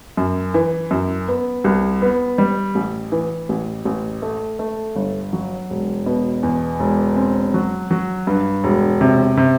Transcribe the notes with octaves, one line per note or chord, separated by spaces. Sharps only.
F#2
E3
F#2
B3
C2
B3
G3
A1
E3
A1
A1
A3
A3
G1
F#3
E1
B2
E2
E1
C4
F#3
F#3
G2
E1
C3
C3